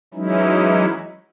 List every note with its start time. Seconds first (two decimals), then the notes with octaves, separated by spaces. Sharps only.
0.14 E3 F#3 G#3 C#4 D#4 E4